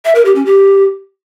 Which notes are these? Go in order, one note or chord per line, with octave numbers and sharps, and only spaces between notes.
E5
A#4
G4
C#4
G4